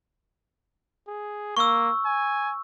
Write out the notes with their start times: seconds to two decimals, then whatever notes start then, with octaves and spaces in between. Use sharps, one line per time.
1.08 G#4
1.57 A#3 C#6 E6
2.05 G#5